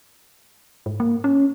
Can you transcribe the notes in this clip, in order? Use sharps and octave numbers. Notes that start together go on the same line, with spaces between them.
G#2
A#3
C#4